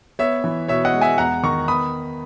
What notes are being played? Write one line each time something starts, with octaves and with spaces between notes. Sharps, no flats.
B3 C#5 E5
E3
B2 C#5 E5
D#5 F#5
G#3
E5 G#5
E2 F#5 A#5
D#3 A#5 C#6
B3 B5 D#6